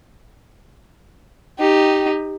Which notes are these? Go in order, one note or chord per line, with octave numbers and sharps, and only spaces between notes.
D#4 G4